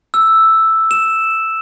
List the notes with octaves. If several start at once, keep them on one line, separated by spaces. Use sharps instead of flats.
E6
E7